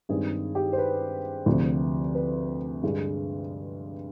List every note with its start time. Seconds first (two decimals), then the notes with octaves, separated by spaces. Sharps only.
0.09 G2 D#3 G#3 C4 G#4
0.55 G4
0.73 C5
0.78 B4
1.46 D2 C3 F3
2.15 B4
2.83 G2 D3 G#3